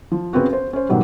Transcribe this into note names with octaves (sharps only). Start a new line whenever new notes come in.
F3
C#3 B3 C4 F#4
C5
C#4 C5
G#2 B2 D#3 F#3 G3